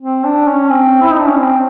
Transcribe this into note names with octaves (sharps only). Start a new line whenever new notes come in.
C4
D4
C#4
C4
E4
D#4
D4
C#4
C4